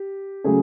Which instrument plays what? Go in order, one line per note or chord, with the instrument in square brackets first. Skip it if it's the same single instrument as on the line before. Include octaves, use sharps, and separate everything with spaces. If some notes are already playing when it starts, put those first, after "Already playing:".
Already playing: [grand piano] G4
C#3 F#3 A3 C#4 G#4